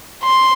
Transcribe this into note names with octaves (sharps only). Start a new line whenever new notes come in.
C6